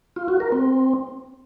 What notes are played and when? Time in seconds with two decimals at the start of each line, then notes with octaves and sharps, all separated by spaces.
0.16 F4
0.28 F#4
0.40 A#4
0.52 C4